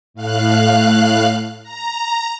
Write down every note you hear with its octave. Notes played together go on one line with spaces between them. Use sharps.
A2 F5 F#6
A#5